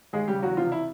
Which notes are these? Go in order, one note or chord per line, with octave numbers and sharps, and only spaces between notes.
D#2 G#3 G#4
C#3 G3 G4
E2 F#3 F#4
C3 F3 F4
E4